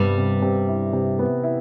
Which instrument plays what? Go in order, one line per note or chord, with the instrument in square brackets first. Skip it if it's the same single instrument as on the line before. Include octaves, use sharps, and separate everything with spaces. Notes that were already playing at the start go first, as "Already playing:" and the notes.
Already playing: [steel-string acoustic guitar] G2 G3 [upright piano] C3 B3
[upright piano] C3
C3
E4
C3
B3
E4